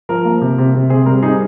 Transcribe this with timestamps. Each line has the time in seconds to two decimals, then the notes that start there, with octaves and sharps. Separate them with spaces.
0.09 F3 A#4
0.25 A#3
0.41 C3
0.58 C3
0.74 C3
0.90 C4 G#4
1.06 G3 A#4
1.22 D#4 G#4